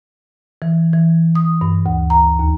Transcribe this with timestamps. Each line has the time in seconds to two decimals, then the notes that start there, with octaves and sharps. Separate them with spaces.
0.62 E3
0.93 E3
1.35 D#6
1.61 G2
1.86 D2
2.10 A#5
2.39 D#2